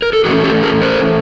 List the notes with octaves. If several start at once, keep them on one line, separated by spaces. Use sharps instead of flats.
A#4
A4
E3 A3 C#4 F#4 G#4
G4 A4
G#4 A#4
A#4 C5